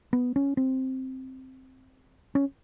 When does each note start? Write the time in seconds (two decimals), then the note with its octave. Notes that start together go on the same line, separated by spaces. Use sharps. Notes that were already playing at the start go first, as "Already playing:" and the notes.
0.13 B3
0.36 C#4
0.57 C4
2.35 C#4